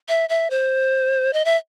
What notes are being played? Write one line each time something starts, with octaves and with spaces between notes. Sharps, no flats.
E5
E5
C5
D#5
E5